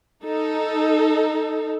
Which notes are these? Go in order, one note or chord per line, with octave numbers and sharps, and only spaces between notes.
D#4 A4